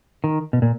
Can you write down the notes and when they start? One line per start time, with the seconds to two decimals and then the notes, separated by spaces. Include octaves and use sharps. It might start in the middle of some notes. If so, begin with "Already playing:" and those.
0.24 D#3
0.53 B2
0.62 A#2